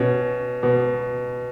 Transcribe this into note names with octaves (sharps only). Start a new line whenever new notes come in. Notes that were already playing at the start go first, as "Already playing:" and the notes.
Already playing: B2 C#4
B2